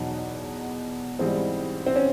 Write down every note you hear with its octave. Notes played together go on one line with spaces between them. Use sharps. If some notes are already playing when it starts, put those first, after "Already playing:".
Already playing: E2 B2 F#3 D#4
G#2 E3 G3 C4
C4
C#4